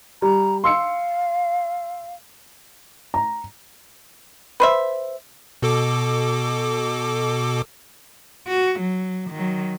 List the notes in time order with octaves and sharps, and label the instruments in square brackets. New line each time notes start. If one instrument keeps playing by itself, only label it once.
[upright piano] G3 [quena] A#5
[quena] F5 [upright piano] C6 E6 C#7
[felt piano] A#5
[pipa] B4 C5 E5
[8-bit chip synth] B2 A4 D6
[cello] F#4
F#3
D#3 F#3